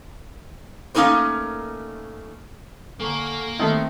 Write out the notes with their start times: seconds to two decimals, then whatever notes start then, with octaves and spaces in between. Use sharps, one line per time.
0.95 A3 A#3 C#4 D#4 A#4 C5
3.00 D3 A#3 A4 A#4 G#5 C#6
3.59 D#3 A3 C4 E5 D#6